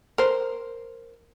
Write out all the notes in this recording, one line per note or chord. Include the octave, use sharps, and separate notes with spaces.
A#4 C5